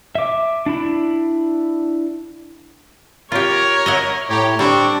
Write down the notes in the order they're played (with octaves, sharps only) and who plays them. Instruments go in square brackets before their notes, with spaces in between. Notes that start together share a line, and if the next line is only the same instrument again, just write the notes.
[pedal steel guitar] E5 D6
D4 E4 B5
[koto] F4 G4 [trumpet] A#4 [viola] C#5
[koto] D#5 E5 F#5
[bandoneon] A2 C#5 [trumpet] G4 [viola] A#5
[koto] G3 [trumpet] C4 [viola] D4 [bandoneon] C#6